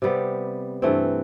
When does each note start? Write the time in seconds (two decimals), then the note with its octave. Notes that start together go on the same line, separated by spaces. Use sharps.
0.02 C3 G3 B3
0.82 G2 E3 A3 C4